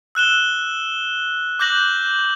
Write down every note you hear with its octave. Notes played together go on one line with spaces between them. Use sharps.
E6 F#6 E7 G7
D6 F#6 G6 A#6 F#7